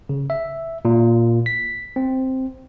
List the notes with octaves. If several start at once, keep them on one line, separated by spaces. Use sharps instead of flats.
C#3
E5
A#2
B6
C4